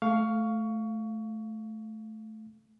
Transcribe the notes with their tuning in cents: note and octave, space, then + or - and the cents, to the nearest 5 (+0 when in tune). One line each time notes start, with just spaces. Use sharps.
A3 -15 F5 +0 C#6 +20